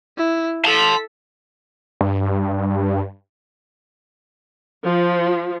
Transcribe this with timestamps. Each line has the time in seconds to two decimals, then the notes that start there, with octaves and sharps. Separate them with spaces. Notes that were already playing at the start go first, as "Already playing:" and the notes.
0.17 E4
0.65 A4 A5 C6 B6
2.01 G2
4.83 F3